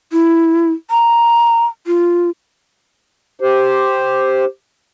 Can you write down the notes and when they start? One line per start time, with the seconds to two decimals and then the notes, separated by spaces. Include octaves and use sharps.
0.12 E4
0.90 A#5
1.87 F4
3.40 G4 C5